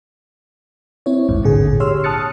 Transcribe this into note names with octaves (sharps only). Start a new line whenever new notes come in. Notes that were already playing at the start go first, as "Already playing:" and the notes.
C4 E4 C#5
A1 D#2 G#2
A1 A#2 D3 G#4 G#5
G4 C#5 C6 E6 F6
A5 D#6 F6 F#6 A6 C#7